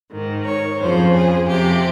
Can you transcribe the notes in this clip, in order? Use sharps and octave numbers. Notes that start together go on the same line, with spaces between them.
G#2 D#3
C#5
F2 C#3 F3 C5
G#4
F2 C3 F3 G4